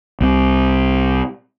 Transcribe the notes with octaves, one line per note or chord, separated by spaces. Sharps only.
C2 C3